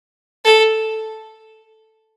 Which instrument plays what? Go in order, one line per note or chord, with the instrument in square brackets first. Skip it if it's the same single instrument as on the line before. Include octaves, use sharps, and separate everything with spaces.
[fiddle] A4